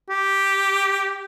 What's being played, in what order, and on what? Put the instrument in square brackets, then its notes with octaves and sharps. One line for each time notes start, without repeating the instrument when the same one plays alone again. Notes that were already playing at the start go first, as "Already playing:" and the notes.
[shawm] G4